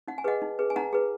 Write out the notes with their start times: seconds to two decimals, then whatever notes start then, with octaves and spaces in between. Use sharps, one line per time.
0.08 D#4 F#5
0.18 G#5
0.24 G#4 B4 D#5 F#5
0.42 D#4
0.59 G#4 B4
0.70 G#5
0.76 D#4 F#5 A#5
0.93 G#4 B4